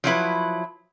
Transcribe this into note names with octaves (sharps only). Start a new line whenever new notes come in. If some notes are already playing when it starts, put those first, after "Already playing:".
F3 F#3 E4 B4